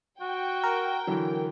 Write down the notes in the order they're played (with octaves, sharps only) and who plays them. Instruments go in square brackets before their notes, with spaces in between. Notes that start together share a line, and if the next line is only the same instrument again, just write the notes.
[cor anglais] F#4 [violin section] G5
[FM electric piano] A#4
[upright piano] D3 E3 F#3